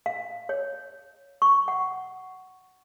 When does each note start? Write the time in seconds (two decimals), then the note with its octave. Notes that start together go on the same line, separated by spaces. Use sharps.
0.06 F5
0.49 C#5
1.42 C#6
1.68 F#5